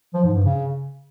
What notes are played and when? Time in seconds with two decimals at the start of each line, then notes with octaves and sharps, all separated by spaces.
0.14 F3
0.24 G#2
0.34 G2
0.44 C#3